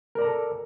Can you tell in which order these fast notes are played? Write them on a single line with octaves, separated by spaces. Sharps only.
A#4 D5 A#5 A4